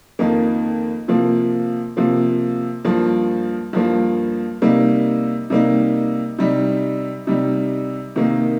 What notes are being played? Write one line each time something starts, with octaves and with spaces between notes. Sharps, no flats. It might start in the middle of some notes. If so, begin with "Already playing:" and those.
F2 D#3 A#3 D#4
C3 F3 A#3
C3 F3 A#3
G2 F3 A#3
G2 F3 A#3
C3 G3 A#3 D#4
C3 G3 A#3 D#4
C3 G3 D#4
C3 G3 D#4
C3 D#3 A#3 D#4